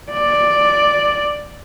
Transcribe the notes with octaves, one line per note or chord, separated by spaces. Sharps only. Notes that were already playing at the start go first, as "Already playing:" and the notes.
D5